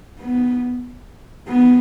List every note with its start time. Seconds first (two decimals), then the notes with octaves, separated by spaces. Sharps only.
0.21 B3
1.48 B3